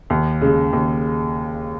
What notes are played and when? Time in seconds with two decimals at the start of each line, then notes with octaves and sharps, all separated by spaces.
0.10 D#2
0.41 C#3 G#3
0.73 D#2